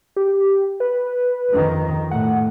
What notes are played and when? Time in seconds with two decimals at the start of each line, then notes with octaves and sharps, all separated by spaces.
0.16 G4
0.80 B4
1.51 F2 D#3
2.11 A2 F#5